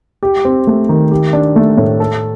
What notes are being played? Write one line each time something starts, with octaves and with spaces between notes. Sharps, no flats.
G4
C4
A3
D#3
G4
D4
A3
A2
A4